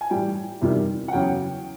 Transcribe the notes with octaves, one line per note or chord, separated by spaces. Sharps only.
G#5
A2 E3 G3 G5
E2 C3 D#3 G3
F#5
E2 C#3 F#3 G5